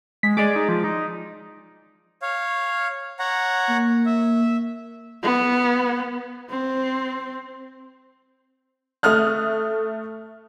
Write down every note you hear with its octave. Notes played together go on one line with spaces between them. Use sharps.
G#3 B6
G#3 G#4 D5 D6
D#4
F3
D#4
C#5 F5
C#5 F#5 A#5
A#3
E5
B3
C4
A3 D#6 F6 F#6